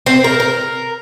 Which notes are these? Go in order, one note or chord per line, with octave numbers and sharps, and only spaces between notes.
C4
A#4
A#4